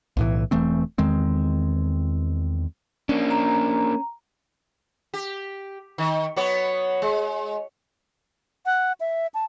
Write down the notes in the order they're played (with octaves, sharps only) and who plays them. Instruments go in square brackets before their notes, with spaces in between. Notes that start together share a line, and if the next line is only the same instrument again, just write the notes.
[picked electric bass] B1 A2 E3
E1 E3 A3 C4
E2 D#3 G#3 C4
[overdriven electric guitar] A#3 D4 [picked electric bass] C#4
[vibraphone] A#5
[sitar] G4
D#3
F#3 B3 C#5
G#3
[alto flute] F#5
E5
A5